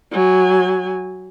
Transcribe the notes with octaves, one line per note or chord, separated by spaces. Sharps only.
F#3 G#5